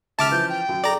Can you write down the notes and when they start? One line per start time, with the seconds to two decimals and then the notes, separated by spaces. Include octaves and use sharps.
0.19 C#2 C#3 E5 A5 D6 F6
0.31 E3 F3 G6
0.49 G5
0.69 F#2
0.84 G#4 A4 D5 A#5